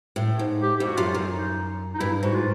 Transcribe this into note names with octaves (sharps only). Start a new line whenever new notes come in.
A2
G#2
G4
F2 G4
F#4
F#2 F4
F#2
D#4
D#4
G2 E4
G#2 F#4
F4